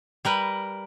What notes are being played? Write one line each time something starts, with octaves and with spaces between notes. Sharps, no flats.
G3 A#4 B4